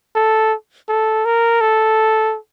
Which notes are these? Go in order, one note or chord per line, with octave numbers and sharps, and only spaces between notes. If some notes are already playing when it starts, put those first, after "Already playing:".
A4
A4
A#4
A4